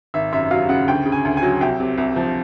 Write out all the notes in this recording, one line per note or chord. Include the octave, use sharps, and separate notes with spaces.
G#1 E5
F#2 E5
F#3 F5
C#3 F#5
D2 G5
C#3
G#5
D2
G#5
F#3
C2 G5
C3
C2
F3